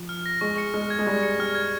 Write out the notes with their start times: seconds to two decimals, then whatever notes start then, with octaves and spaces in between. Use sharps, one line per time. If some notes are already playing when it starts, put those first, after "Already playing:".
Already playing: F3
0.09 F6
0.26 A#6
0.41 G#3 C#6
0.58 C#7
0.74 G#3 F6
0.90 G#6
0.99 G#3
1.07 G3 C#6
1.23 C#7
1.39 G3 F6
1.55 G#6